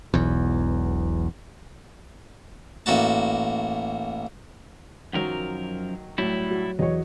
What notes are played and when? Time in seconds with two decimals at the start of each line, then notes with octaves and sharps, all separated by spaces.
0.14 E1 B1 E2
2.86 A1 A#3 F#4 A5
5.13 F#2 D#3 F3 F#3 A#4
6.18 A2 F#3 G3 E4
6.51 F#4
6.79 E2 F#3 C#5 D#5